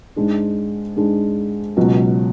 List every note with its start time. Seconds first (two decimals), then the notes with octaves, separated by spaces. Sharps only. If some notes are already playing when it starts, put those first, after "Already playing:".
0.16 G#2 G#3 D4
0.96 G#2 G#3 D4
1.76 C#2 B2 F#3 C#4